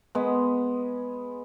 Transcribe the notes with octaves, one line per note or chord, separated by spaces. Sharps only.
G#3 B3